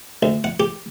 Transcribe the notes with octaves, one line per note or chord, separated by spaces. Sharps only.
D2
F#5
G4